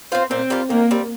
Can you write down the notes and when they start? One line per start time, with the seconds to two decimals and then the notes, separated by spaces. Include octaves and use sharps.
0.12 C4 F4 C5
0.31 A#2 C4
0.50 G3 A#3 F4
0.70 D#3 A#3
0.91 G3 C4